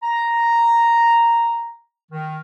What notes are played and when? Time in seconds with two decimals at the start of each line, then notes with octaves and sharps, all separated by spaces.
0.02 A#5
2.11 D#3